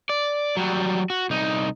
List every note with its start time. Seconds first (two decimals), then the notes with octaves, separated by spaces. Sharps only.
0.09 D5
0.57 F#3 G3
1.10 F#4
1.30 C2 D#4